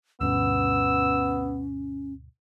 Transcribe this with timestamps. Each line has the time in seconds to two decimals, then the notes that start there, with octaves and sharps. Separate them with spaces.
0.21 D2 G2 B2 B3 C#4 E6